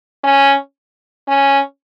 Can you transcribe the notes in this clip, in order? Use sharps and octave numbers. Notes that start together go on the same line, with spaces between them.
C#4
C#4